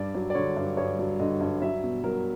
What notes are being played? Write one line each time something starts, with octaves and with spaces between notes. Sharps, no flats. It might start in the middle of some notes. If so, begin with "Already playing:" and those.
Already playing: G2 D5
F#3
D5
D3 C#5
G2
G2 C#5
F#3
D3 D#5
G2
F#3 E5
B2
F#3 A#4